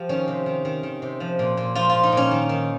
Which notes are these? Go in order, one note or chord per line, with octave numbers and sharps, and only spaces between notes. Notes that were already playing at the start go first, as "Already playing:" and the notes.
Already playing: F3 G4
D#3 C#4
C3
D#3
D#3
D#3
C3
F3
A#2
A#2
F3 F4
A#2 F4
D#4
A#2 C#4
D#3
D#3